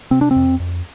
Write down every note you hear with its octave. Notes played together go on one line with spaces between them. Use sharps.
C3 C4
D4
C4
F2
F2